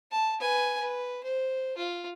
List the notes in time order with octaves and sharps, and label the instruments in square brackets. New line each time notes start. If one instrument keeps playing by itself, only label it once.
[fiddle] A5
B4 G#5
B4
C5
F4